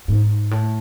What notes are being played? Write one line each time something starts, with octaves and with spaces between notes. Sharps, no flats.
G#2
A2